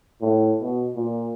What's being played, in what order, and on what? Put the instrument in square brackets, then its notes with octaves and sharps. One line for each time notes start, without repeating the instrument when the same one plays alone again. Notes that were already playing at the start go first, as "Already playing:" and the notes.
[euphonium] A2
B2
A#2